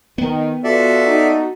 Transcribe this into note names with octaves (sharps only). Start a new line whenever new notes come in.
D#3 B3
B2 F4 F#4 A4 D5 E5
D#4 F#4